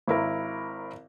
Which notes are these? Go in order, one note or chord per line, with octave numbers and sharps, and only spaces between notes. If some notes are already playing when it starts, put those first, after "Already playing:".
G#1 E4 A#4